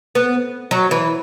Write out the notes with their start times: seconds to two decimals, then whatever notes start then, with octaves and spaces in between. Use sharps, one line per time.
0.15 B3
0.71 F#3
0.91 E3